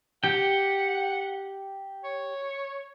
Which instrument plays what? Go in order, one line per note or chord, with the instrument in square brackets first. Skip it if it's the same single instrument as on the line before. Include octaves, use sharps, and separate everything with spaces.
[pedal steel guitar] G4 G5 [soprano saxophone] F#5
[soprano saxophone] C#5